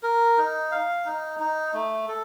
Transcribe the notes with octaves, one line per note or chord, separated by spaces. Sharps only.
A#4
D#4
F5
D#4
D#4
A3
A4